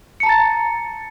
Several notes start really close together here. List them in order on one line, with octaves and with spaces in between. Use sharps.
C#7 A5 A#5 A6